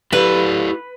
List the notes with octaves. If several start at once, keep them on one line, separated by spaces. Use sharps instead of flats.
E4 G4 A4 B4 D5